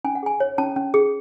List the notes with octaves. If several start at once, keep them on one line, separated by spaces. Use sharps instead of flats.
C#4 G#5
F#5
G#4 G#5
C#5
C#4 A5
C#4
G#4